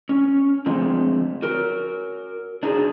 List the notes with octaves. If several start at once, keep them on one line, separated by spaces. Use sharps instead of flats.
C#4
D3 F3 G#3 A3 C4
F#4 A#4
D4 D#4 F#4 G#4